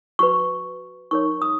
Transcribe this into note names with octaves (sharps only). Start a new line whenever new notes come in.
F#4 B4 C#6
D#4 A#4 C#5 C#6
D#6